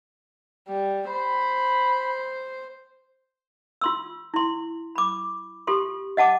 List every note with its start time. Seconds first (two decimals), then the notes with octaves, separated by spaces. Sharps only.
0.68 G3
1.10 C5 B5
3.81 F4 C6 E6
4.34 E4 C6
4.96 B5 D6
5.67 F4 G4 A4 C6
6.17 D#5 F#5 A5 D6